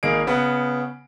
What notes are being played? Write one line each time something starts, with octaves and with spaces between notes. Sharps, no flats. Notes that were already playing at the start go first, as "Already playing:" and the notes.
G#1 A#3 D#4 G#4 F5 D7
C#3 B3 F#5